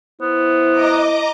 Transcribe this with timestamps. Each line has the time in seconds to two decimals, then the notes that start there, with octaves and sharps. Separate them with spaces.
0.22 B3 E4 C5
0.72 D#5 A#5 D6